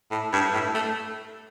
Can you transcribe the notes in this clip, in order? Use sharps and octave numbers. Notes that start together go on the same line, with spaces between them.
A2
G2
A2
A3